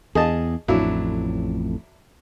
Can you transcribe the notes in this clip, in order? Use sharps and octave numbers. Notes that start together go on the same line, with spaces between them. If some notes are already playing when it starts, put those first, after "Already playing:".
E2 G#4 D#5 A5
A1 F2 A2 F#3 D4 E4